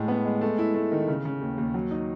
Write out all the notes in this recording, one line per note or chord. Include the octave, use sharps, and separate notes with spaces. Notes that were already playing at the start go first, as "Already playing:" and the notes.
Already playing: A2 G#3
B3
G#3
A3
E4
A3
D#3
C#3
C#3
D#2
D#2
F#3
D#4